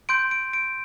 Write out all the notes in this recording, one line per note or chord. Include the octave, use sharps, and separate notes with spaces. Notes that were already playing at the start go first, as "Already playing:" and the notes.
C6 G6 D7
D7
D7